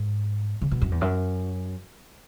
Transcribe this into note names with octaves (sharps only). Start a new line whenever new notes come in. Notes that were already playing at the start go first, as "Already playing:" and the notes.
Already playing: G#2
C#3
B2
F#2
E2
F#2